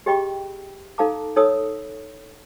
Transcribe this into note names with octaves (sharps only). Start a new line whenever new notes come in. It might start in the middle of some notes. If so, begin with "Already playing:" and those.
G4 G#4 D#5 G5 B5 C#6
D#4 A4 F5 A5 A#5 D6
D#4 A4 C#5 D#6 E6